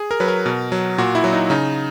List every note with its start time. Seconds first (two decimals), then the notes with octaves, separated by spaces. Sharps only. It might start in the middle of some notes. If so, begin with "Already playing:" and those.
Already playing: G#4
0.11 A#4
0.20 F#3 B4
0.28 A#4
0.46 B2
0.72 F#3
0.98 A#2 F#4
1.15 E4
1.24 F#3
1.33 D#4
1.50 C#3 D#4